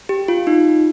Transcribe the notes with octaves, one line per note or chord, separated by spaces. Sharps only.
G4
F4
D#4